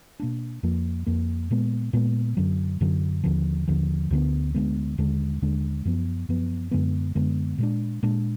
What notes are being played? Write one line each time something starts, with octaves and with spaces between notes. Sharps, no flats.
B2 A#3 D4
F2 F3 A#3
F2 F3 A#3
A#2 G#3 B3
A#2 G#3 B3
F#2 D3 F#3
F#2 D3 F#3
D#2 D3 F3
D#2 D3 F3
D2 D3 G#3 B3
D2 D3 G#3 B3
D#2 D3 G#3 D4
D#2 D3 G#3 D4
F#2 F3 B3
F#2 F3 B3
F#2 D3 G#3 B3
F#2 D3 G#3 B3
A#2 G#3 D4
A#2 G#3 D4